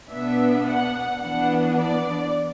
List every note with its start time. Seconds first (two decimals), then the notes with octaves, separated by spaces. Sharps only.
0.10 B2 B3 D4 E5
0.67 F#5
1.23 E3 B3 D4 F#5
1.78 D5